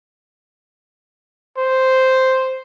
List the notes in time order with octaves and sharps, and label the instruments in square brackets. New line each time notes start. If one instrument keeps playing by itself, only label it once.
[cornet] C5